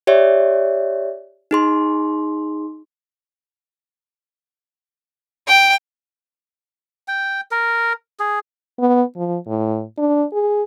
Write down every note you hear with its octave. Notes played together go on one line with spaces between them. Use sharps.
G4 C#5 D5 E5
D#4 G#4 C6
G5
G5
A#4
G#4
B3
F3
A2
D4
G#4